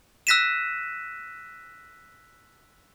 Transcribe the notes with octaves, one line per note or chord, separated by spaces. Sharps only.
E6 F#6 A#6 B6 D#7 E7